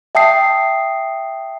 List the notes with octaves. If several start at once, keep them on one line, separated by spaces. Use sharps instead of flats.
E5 G5 A5 D#6 C7